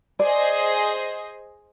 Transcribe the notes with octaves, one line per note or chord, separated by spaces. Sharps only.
G#4 C5 D5 D#5 G#5